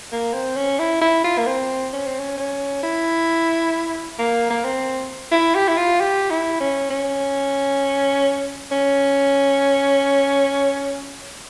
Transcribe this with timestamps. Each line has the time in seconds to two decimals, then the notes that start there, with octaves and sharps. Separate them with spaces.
0.12 A#3
0.34 C4
0.56 C#4
0.79 E4
1.02 E4
1.24 F4
1.38 A#3
1.47 C4
1.93 C#4
2.06 C4
2.19 C#4
2.38 C#4
2.83 E4
4.19 A#3
4.50 A#3
4.65 C4
5.31 E4
5.55 G4
5.68 E4
5.77 F4
6.00 G4
6.31 E4
6.60 C#4
6.90 C#4
8.71 C#4